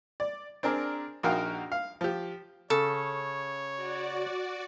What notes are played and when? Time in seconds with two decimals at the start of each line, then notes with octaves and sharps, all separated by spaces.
0.20 D5
0.63 C4 D4 G#4 A#4 D5
1.23 A#1 D#4 F#4 A#4 F5 G5
1.72 F5
2.01 F3 G4
2.70 C#3 A4 C#5
3.76 F#4 D5